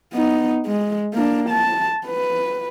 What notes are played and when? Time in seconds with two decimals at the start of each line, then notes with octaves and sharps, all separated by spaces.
0.14 B3 D#4
0.66 G#3
1.14 A#3 D4
1.49 A5
2.06 B4